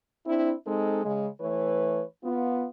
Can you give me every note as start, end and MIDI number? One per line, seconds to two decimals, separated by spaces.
0.27 0.53 60
0.27 0.53 62
0.27 0.53 64
0.67 1.03 56
0.67 1.03 60
0.67 1.03 63
0.67 1.03 69
1.05 1.29 49
1.05 1.29 56
1.41 2.04 52
1.41 2.04 57
1.41 2.04 71
1.41 2.04 73
2.24 2.67 59
2.24 2.67 65